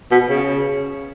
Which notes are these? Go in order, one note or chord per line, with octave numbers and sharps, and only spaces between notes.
B2
C#3